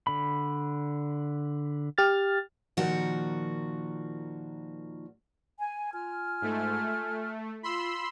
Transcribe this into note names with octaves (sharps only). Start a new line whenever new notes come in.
D3 B5
G4 F6 A6
A#2 D#3 F3 F#4
G#5
F4 G#5 F6
G#2 A3
A3
F4 B5 C6 E6